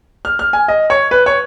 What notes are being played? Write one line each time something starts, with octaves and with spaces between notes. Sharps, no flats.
F6
F6
G#5
D#5
C#5
B4
C#5